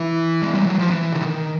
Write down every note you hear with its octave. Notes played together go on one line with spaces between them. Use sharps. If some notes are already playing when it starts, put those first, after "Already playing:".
Already playing: E3
G#3
G3
F#3
F3
E3
D3
D#3